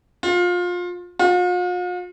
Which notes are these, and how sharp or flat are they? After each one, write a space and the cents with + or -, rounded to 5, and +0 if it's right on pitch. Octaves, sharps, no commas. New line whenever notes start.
F4 +25
F4 +45